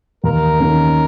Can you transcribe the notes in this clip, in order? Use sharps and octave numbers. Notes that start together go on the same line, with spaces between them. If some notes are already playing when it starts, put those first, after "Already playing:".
D#2 A#4
D#3 A#3 C#4